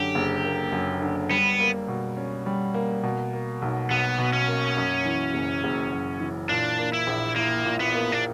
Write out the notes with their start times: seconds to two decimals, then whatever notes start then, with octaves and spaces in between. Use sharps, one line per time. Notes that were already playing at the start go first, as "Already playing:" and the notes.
Already playing: F#2 D3 G4
0.15 F#1
0.44 A#3
0.72 F#2
1.02 D3
1.30 G3 B3
1.60 A#3
1.88 B2
2.17 C#4
2.46 G3
2.74 A#3
3.03 B2
3.33 A#3
3.62 B1
3.91 B1 B3
4.19 B2
4.33 C#4
4.48 A#3
4.77 F#2
5.05 E3
5.34 F#1
5.64 F#1
5.92 F#2
6.21 E3
6.49 A#2 D4
6.78 A#3
6.93 E4
7.07 A#1
7.36 A#3 E4
7.65 A#2
7.80 B3
7.95 A#3
8.12 D4